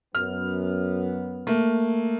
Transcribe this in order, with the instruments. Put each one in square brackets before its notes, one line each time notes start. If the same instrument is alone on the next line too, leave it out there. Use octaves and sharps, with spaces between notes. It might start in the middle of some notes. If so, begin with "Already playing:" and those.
[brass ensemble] F#2 B3 [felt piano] F6
[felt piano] A3 A#3